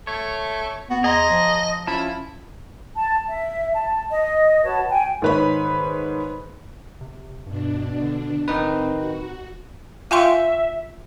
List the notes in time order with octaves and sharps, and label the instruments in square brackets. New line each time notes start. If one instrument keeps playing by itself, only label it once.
[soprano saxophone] A3 [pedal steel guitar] C#5
[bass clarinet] B3 [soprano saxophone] F#4
[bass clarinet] E2 [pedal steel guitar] G#4 A#5 C6 [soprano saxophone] D#5
[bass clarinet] F3
[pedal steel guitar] C#4 F4 A5 [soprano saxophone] E4
[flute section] A5
E5
A5
D#5
F#4 B4 C#5 A5
G5 G#5
[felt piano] G#2 D#3 B4 C#5 B5
[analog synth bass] C3
[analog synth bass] G2 [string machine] B2 D4
[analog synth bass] D3
[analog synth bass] D1 [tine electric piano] D#3 D#4 B4 [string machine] C4
[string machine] F#4
[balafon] F4 G#5 C6 [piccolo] E5 [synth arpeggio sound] F5 G5 C#6